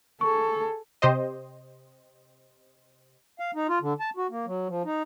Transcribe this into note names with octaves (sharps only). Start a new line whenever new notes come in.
G#4 A4 C#6
C3 G4 C5 D#5
F5
D#4
F4
D3
A5
F#4
A#3
F#3
F3
D#4